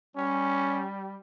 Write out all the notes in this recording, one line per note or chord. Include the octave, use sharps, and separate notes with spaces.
G3 C#4